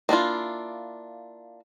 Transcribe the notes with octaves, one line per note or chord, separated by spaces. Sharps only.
A#3 D4 E4 F4